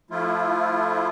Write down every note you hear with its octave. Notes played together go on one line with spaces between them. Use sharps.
F3 A3 E4 F4